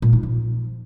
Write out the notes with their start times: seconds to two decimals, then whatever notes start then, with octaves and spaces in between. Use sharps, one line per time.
0.02 A#2
0.13 D#4
0.23 F3